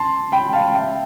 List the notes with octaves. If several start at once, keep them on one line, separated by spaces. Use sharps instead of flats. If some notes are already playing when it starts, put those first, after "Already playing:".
Already playing: A5 C6
G5 B5
F5 A5
E5 G5